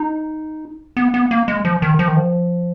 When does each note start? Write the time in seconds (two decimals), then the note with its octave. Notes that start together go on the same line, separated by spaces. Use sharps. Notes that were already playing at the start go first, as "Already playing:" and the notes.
Already playing: D#4
0.97 B3
1.14 B3
1.31 A#3
1.48 G#3
1.65 F3
1.82 D#3
1.99 F3
2.08 D#3
2.17 F3